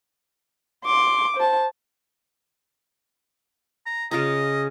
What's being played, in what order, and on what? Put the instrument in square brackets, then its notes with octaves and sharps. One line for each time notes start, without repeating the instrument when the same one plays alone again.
[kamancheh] C6 D6
C5 A5
[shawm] A#5
[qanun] C#3 F4 A#5 [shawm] D#5